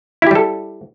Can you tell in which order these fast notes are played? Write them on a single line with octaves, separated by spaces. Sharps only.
E4 G4 G3 A4